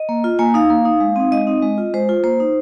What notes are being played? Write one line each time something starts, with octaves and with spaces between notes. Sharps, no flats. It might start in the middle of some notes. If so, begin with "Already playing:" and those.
Already playing: D#5
A#3
F4
A#3 G#5
D#4 F5
A#3
D#4
G#3
C4 D#4
G#3 D#5
C4 D#4
G#3
F4
G#3 C5
F4
A#3 C5
D#4